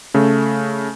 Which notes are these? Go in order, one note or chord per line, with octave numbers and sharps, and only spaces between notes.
C#3 A3